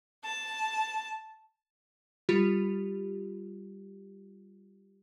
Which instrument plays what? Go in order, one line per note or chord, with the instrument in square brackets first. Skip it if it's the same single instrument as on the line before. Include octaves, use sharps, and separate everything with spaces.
[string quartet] A5
[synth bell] G3 F4 G4